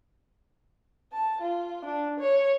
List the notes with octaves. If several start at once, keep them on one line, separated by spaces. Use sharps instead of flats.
A5
F4
D4
C#5